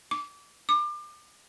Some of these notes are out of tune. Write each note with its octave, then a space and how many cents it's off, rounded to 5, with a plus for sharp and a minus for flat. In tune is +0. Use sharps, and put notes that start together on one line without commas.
D6 -25
D6 +30